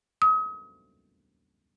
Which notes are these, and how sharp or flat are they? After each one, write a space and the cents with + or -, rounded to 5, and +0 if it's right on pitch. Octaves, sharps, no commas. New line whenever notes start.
D#6 +40